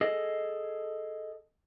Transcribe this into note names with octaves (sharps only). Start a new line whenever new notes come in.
G#4 A4 D#5